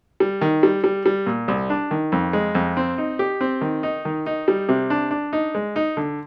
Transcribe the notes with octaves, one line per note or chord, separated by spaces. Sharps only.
G3
D#3
G3
G3
G3
A#2
C2
D4
D#3
F2
G#3
F2
C4
D#4
G4
C4
D#3
D#4
D#3
D#4
G3
C3
D4
D4
D#4
G#3
D#4
D3